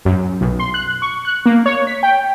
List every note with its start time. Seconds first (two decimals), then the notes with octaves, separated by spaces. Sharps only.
0.05 F#2
0.41 B1
0.59 C6
0.74 F#6
1.02 C#6
1.25 F#6
1.46 A#3
1.66 C#5
1.87 B6
2.03 G5